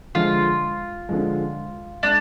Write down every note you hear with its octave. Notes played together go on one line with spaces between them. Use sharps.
D3 F3 G#3 F4
D3 F3 G#3
G#3 D4